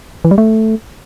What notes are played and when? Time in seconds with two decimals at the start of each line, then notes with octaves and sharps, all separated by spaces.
0.25 E3
0.31 G3
0.38 A3